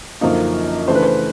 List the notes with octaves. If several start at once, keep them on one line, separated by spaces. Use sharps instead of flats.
F#2 D3 F3 A#3 D#4
C#3 E3 A3 D4 C5
B4
C5